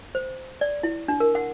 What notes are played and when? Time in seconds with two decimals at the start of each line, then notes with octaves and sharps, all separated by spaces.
0.15 C5
0.61 D5
0.83 E4
1.08 D4
1.20 A#4
1.35 F#5